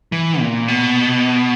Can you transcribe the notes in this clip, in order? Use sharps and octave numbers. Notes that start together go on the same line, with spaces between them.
E3
A#2
B2